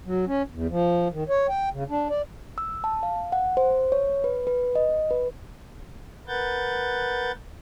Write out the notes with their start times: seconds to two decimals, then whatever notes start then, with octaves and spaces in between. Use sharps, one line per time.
0.06 F#3
0.27 C#4
0.52 E2
0.70 F3
1.12 D#3
1.29 C#5
1.49 G5
1.73 C#3
1.90 D4
2.10 D5
2.58 E6
2.84 A5
3.03 F5
3.32 F#5
3.57 C5
3.92 C#5
4.24 B4
4.47 B4
4.75 D#5
5.11 B4
6.28 A#4 B4 F#5 G6 A6